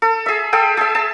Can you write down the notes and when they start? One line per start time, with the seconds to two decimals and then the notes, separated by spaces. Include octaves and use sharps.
0.02 A4
0.26 G#4 E5
0.53 G#4 A4 G5
0.77 G#4 E5
0.95 A5